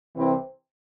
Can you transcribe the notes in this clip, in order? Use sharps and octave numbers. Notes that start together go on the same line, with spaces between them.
C2 C3 E3 C4 E4